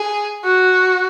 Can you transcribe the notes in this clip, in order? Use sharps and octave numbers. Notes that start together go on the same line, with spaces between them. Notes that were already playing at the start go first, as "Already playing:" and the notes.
Already playing: G#4
F#4